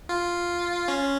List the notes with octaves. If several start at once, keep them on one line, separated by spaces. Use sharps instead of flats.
F4
C#4